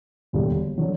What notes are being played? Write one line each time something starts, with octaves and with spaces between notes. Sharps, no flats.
E1 D#2 D3 G3
D3 F#3